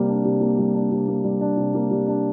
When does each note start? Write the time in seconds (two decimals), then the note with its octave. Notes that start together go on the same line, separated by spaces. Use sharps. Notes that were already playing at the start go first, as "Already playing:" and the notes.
Already playing: C3 G3 A#3
0.08 D4
0.25 C3
0.41 A#3
0.58 G3
0.74 D4
0.91 C3
1.08 A#3
1.24 G3
1.41 D4
1.57 C3
1.75 A#3
1.91 G3
2.08 D4